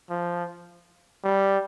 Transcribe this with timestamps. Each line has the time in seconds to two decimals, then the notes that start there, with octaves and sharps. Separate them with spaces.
0.10 F3
1.24 G3